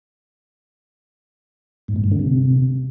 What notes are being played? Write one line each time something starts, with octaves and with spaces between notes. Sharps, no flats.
G#2
A2
G2
D3
C3